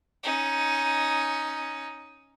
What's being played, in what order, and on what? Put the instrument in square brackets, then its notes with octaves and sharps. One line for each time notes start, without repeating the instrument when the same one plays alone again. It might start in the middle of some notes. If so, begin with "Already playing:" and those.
[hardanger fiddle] C#4 D#4